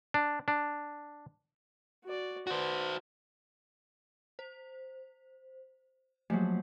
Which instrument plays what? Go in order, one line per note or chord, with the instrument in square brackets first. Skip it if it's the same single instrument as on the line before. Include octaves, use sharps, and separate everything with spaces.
[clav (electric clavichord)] D4
D4
[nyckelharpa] F#4 D5
[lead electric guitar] F#4 C5 [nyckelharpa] B4 D5
[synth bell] C5
[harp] F3 F#3 [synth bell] A3 A#3